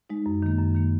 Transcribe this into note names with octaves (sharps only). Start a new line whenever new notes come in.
G#3 D#4
F#2
D#3 A#3
F#2
D#3 A#3